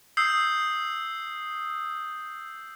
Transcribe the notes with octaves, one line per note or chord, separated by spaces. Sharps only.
D#6 E6 G6 C7